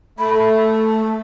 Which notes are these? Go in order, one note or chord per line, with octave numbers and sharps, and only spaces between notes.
A3 B5
A4